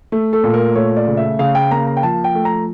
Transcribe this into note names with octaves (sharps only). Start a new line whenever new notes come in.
A3
A4
A#2
A#4
A3 C#5
D5
C#3
E5
C#3 F5
G5
A#3 A#5
A#5
G5
F3 A5
G5
A3
A#5